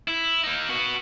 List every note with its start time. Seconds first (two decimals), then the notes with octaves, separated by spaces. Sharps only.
0.08 E4
0.44 A#3 D#4
0.69 B3 F#4